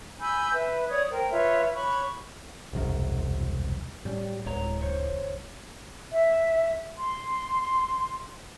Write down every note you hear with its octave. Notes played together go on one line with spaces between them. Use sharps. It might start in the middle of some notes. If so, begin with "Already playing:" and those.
G#5 B5 E6 G6
B4 E5
C#5 D5 D#6 G#6
A#4 C5 G5
F4 B4 C#5 E5
C#5 B5 C#6 F#6
E1 C2 F#2
A2 F#3 G3 C#4
D1 G#3 C#5 A#5
D#1 C#2 F#2 C5 C#5
E5
C6